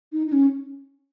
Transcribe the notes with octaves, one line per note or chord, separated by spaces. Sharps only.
D#4
D#4
C#4